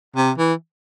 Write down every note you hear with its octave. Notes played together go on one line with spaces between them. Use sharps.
C3
E3